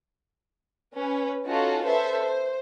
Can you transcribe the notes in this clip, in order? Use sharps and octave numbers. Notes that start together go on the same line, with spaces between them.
C#4 B4
C#4 D#4 F4 F#4 A4
A4 B4 C5 E5
C5